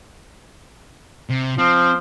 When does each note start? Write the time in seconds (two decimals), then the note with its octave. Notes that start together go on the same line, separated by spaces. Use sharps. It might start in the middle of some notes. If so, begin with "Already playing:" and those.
1.30 C3
1.58 F3 C4